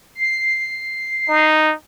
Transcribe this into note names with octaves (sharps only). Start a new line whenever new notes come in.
C7
D#4